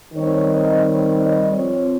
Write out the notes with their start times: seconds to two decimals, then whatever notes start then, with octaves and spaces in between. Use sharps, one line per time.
0.14 D#3 G3 C4 C#5
0.49 D#5
0.84 C#5
1.19 D#5
1.52 F3 C4 C#5